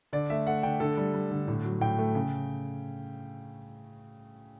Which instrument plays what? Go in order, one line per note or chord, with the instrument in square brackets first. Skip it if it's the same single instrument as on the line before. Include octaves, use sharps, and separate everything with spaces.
[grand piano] D3 D5
A3 E5
A3 F#5
D3 G5
D3 A4
G3
G3
D3
A2
F#3
A2 G5
A3
C#3